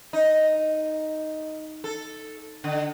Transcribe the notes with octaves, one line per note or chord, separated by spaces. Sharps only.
D#4
A4
D3